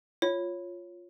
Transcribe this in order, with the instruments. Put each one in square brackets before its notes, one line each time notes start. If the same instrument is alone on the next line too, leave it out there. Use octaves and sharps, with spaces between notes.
[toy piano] F4 [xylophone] C#5